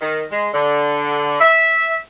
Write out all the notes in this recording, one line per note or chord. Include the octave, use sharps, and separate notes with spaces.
D#3
G#3
D3
E5